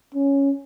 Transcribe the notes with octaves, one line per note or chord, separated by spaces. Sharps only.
C#4